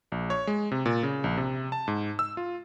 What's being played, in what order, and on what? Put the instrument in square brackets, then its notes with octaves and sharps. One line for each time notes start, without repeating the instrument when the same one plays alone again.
[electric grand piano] A#1
C#5
G#3
C3
A#2
C#3
A#1
C3
A5
G#2
E6
F4